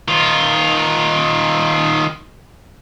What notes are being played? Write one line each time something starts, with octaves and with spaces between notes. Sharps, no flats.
D#3 F4